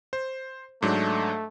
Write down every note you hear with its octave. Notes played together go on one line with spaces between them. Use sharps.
C5
G#2 F#3 A3 D4